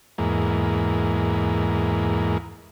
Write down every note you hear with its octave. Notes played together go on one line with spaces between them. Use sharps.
E2 G#2 A#3